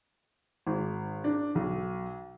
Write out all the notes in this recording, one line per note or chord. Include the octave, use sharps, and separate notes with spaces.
G#1
D4
B1